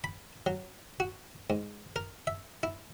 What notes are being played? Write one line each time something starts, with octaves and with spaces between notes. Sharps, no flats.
B5
F#3
F#4
G#2
A#4
E5
E4